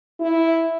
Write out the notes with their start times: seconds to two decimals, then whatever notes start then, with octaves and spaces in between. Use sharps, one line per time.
0.20 E4